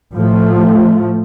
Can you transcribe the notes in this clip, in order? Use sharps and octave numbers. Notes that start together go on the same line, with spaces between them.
A2 F3 A3